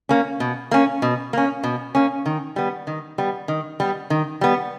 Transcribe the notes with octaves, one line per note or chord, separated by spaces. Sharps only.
A#3 C#4
B2
A#3 C#4
B2
A#3 C#4
B2
A#3 C#4
D#3
G3 B3
D#3
G3 B3
D#3
G3 B3
D#3
G3 B3